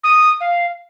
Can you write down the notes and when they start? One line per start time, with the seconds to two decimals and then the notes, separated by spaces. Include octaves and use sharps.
0.04 D#6
0.41 F5